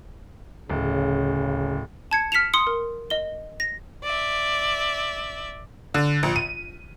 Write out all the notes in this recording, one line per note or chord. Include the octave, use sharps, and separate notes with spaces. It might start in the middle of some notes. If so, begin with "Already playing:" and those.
D1 C#3
A5 G#6 C#7
F6 B6 C#7 E7 F7
C6 D#6 C#7
A#4
D#5 G7
A#6
D5 E5
D3
A#1
D#7